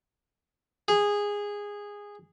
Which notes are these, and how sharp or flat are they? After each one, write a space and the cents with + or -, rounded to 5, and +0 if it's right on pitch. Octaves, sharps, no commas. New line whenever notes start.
G#4 -15